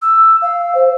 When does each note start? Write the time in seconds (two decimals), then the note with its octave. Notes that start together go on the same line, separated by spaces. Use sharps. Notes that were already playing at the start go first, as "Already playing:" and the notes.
0.02 E6
0.42 F5
0.75 C5